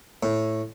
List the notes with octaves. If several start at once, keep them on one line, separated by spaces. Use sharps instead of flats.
A2